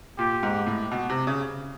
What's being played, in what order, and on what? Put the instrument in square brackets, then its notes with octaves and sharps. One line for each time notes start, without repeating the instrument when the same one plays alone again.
[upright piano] A#2 [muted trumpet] G4
[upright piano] G#2
A2
B2
C3
C#3